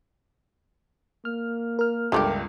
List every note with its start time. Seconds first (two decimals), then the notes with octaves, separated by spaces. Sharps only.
1.25 A#3 F6
1.79 A#4 F6
2.12 G1 C#2 G3 A3 G4 D6